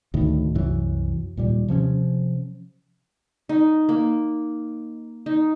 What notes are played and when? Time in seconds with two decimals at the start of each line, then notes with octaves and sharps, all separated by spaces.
0.14 D2 A2 D#3
0.55 C2 F#2 E3 F#3
1.37 D#2 A#2 G3
1.68 C3 F3 A3 C#4
3.49 D#4
3.89 A#3
5.26 D#4